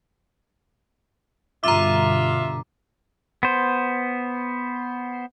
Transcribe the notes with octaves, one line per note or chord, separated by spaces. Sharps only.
G2 B2 D3 F4 E5 A#5 D6
B3 C5